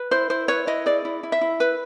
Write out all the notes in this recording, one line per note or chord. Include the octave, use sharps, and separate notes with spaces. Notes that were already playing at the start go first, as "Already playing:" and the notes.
Already playing: B4
E4 C5
E4 C5
B4 C#5
E4 D#5
G#4 D5
E4
E4
E5
E4
B4